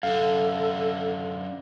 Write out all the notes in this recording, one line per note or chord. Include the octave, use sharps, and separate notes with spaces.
F#2 D3 A4 F5